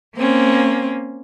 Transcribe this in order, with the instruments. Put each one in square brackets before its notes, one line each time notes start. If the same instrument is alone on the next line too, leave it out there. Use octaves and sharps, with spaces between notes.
[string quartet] A#3 C4 C#4